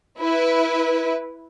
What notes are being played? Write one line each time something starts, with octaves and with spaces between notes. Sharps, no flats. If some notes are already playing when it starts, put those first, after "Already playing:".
E4 B4